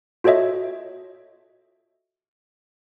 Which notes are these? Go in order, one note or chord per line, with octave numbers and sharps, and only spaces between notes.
F4 F#4 A4 C#5 D#5 E5